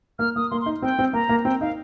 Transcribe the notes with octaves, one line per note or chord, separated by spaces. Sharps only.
A#3 F6
A#3 D#6
A#3 C6
C6
D#4
C4 G5
C4
A#3 A#5
A#3
C4 G5
D#4 F5